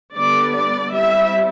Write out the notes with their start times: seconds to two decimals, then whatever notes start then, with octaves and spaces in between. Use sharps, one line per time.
0.15 D3 G3 B3 D5
0.54 D5
0.93 G3 C4 E4 E5